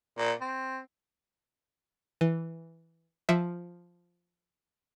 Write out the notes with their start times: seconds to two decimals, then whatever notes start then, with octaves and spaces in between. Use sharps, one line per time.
0.18 A#2
0.41 C4
2.21 E3
3.29 F3 E5